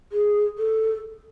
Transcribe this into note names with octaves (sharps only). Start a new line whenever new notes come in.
G#4
A4